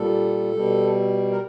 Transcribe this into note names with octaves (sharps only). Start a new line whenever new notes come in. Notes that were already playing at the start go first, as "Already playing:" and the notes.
Already playing: A#2 G3 A4
B2 G3
A#4